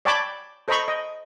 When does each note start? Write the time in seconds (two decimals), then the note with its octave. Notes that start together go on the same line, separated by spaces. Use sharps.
0.05 C#5 D5 G5 A5 B5 D6
0.68 A4 C5 D#5 A#5 B5 C#6
0.88 D#5